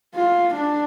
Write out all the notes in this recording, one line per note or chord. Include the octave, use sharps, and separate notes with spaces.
F4
D4